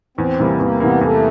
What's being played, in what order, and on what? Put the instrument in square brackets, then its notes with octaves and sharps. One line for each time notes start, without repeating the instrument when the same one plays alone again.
[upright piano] E2 [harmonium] C4
[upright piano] C3 E3 G3 A#3
[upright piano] E2 [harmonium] A#3
[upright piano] C3 E3 G3 A#3 [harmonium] B3
[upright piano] E2 [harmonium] A3